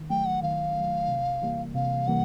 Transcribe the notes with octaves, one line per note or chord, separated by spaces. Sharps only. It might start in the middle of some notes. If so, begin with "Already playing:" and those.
Already playing: D#3
F#3 A3 G5
F#5
D#3 F5
F#3 A3
C3
E3 G3 A#3
C3 F5
E3 G3 A#3 F#5